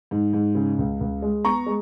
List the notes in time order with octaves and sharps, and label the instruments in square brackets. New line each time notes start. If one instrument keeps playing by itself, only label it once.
[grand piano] G#2
G#2
C#3
C#2
C#2
G#3
B3 A#5 C#6
G#3